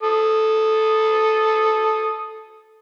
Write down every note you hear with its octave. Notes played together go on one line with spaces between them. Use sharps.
A4 D#6